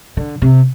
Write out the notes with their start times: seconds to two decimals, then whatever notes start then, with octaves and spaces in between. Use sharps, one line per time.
0.17 D3
0.42 C3